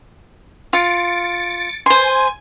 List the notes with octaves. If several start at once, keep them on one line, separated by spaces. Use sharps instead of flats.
F4 A6 C#7 D7
C5 G#5 C6